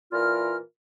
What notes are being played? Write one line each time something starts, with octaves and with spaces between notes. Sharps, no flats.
A#2 E3 F4 A#4 F6